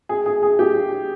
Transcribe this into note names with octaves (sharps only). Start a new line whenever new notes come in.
G#4
G#4
G#4
G4